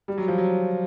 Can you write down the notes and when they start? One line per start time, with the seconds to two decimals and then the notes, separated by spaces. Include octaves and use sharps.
0.08 G3
0.18 F#3
0.28 F3
0.38 F#3